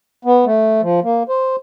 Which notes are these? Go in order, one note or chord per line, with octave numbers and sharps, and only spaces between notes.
B3
A3
F3
A#3
C5